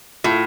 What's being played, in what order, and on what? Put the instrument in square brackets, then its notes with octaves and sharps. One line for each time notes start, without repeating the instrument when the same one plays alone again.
[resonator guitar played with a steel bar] A2 [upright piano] F4